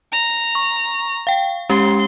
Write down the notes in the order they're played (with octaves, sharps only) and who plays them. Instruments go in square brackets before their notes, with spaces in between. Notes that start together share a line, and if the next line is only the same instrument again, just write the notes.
[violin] A#5
[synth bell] C#6
F5 G5
[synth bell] G#3 C#4 G4 [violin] C6